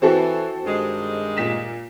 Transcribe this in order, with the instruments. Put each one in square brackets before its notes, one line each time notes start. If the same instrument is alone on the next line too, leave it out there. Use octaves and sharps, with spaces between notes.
[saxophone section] E3 [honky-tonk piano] C4 F#4 A4
[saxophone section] G2 D#3 G#3
[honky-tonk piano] A#2 B6 E7